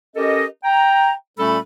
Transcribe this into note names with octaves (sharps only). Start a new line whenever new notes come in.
C#4 G4 A4 A#4 D#5
G5 A#5
A#2 G3 A3 C#4 A4 B5